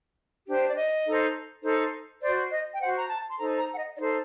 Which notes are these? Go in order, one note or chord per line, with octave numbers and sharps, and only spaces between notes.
D4 G4 C5
D5
D#5
D#4 A4 C5
D#4 A4 C5
F#4 C5 D5
D#5
G5
F#4 C5 F#5
A#5
A5
C6
D#4 A4 C5 A#5
A#5
F#5
D#5
D#4 A4 C5 D5